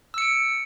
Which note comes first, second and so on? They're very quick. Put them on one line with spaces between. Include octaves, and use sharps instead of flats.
E6 C#7 D7